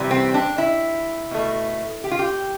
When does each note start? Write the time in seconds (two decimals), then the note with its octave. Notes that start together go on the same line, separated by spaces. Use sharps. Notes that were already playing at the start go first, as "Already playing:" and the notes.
Already playing: C3 E3 G3
0.11 C4
0.34 D4
0.58 E4
1.31 B2 A3
2.04 G4
2.11 F4
2.19 G4